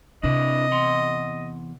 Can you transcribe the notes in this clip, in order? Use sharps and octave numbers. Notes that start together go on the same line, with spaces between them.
C3 C4 D4 E4 B4 D#5
E2 F#5 C6